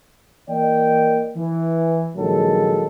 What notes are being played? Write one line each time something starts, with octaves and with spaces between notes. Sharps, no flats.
E3 A#3 D5 D#5 G5
E3
A#1 D#3 F#3 G#3 A4